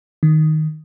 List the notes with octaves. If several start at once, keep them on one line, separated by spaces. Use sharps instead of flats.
D#3